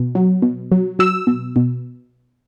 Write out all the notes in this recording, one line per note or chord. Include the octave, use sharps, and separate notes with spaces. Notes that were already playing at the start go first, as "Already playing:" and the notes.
Already playing: B2
F#3
B2
F#3
F#3 E6
B2
B2